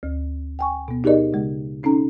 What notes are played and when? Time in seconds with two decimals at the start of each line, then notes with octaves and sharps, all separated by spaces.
0.03 D2
0.59 G5 G#5 C#6
0.88 B2 B3
1.04 D#4 G4 G#4 A#4 D5 D#5
1.33 C#3 G#3
1.83 C4 C#4 D#4 A4 A#5